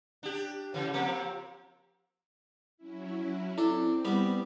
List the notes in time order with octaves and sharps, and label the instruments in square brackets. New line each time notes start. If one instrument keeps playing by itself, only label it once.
[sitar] D4 G4
C#3 E3
F3 A#3 C4
[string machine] F#3 C#4 E4
[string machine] C4 [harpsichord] D4 A4 [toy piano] E4
[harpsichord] G3 B3 G4